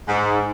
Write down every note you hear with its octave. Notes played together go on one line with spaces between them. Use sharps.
G#2